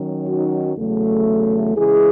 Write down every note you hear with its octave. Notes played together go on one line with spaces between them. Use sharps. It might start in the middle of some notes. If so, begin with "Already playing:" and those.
Already playing: D#3 F#3 C#4
D#4 F#4
E2 C#3 F#3 A3
C#3 E3 G#3 E4 G#4